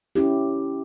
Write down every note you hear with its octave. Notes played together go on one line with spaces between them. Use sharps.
C#4 E4 G4